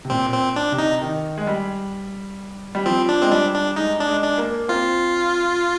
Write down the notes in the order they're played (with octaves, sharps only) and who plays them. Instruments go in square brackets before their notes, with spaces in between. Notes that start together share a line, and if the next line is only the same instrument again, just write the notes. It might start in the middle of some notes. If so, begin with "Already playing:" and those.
[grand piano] C3
[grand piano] A#2 [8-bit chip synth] C4
[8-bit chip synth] C4
D4
[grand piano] C3
[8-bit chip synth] D#4
[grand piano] D#3
G#3
G3
G3
[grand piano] F3 [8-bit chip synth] C4
[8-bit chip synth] D4
[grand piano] G#3 [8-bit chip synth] C4
[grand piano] G3 [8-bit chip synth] D4
[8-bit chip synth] D4
[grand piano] G#3 [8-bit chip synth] D#4
[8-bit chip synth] D4
[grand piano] G#3
[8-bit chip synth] D4
[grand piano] A#3
[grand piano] C4 [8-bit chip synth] F4